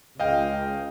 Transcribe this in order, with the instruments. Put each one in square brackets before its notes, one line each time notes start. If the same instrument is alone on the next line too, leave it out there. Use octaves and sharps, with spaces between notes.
[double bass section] C#2 [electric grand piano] D#5 F5 G5